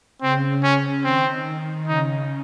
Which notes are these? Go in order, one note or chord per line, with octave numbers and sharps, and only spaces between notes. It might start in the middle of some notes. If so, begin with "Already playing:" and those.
C#3 C4
C#4
D#3 C4
C#3 D#4